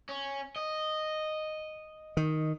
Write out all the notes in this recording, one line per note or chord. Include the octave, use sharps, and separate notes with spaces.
C#4
D#5
D#3